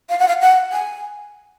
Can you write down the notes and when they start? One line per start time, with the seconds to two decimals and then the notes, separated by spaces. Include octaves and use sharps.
0.10 F5
0.19 F#5
0.28 F5
0.41 F#5
0.72 G#5